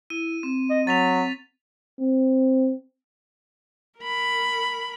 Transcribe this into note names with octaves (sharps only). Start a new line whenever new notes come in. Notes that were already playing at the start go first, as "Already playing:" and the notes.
E4 D#7
C4
D#5
F#3 A6 B6 F7
C4
A#4 B5